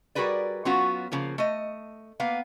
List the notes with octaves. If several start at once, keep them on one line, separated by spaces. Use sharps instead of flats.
G3 F#4 G#4 A#4 B4 D5
F#3 B3 C#4 F4 F#4
C#3 F3 A#3
A3 D#5
A#3 B3 F5